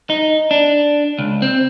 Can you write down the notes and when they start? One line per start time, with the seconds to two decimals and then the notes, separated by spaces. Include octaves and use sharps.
0.10 D#4
0.51 D4
1.19 C#2
1.42 C4